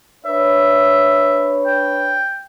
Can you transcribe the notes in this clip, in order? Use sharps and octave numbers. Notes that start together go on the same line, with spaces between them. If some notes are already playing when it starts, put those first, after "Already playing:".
D4 B4 C#5 E5
G5